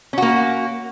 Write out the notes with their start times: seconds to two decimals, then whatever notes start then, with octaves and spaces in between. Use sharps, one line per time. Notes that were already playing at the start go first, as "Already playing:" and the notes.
0.13 C#4
0.18 F#4
0.22 A#3